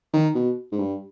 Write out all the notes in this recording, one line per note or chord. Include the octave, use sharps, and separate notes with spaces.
D#3
B2
G#2
G2